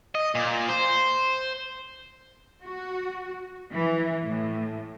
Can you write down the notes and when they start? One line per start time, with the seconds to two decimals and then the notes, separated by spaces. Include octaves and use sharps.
0.15 D#5
0.35 A#2
0.69 C5
2.62 F#4
3.72 E3
4.24 A2